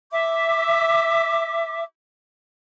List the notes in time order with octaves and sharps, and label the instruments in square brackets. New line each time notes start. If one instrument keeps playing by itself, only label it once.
[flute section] E5 D6